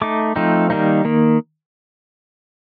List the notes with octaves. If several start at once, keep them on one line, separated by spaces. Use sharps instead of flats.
A3 D#4 D6
F3 A3 C4 D#4
D#3 G3 A#3 D#4
D#3 A#3